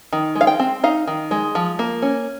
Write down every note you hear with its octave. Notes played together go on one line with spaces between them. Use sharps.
D#3
G#3
F5
G5
C4
D#4 F5
D#3
G#3
F3
A#3
C#4